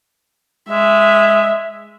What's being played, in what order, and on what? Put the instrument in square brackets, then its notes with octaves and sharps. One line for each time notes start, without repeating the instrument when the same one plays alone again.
[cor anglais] G#3 [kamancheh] E5